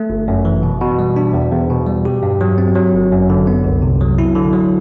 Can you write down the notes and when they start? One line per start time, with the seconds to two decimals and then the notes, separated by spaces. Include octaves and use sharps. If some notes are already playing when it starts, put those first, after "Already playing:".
Already playing: A3
0.10 G1
0.28 F#2
0.45 E3
0.63 B2
0.81 B2
0.99 G3
1.16 D4
1.33 E2
1.51 E2
1.70 B2
1.87 G3
2.05 G4
2.23 G2
2.41 F#3
2.58 C4
2.75 F#3
2.93 G1
3.12 F#2
3.30 D3
3.47 B3
3.64 C2
3.82 C3
4.01 F#3
4.19 E4
4.36 D3
4.53 F#3